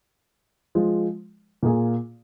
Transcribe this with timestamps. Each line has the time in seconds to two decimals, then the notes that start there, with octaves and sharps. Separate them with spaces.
0.75 F3 G#3 F4
1.63 A#2 A#3 F4 G#4